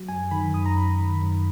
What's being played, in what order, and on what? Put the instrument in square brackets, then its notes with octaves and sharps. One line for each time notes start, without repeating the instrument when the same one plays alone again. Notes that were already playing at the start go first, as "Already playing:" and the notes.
Already playing: [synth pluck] F#3
F#2 G#5
D#3 B5
F#2 D#6
A#5
F#2 B5
D#3
F#2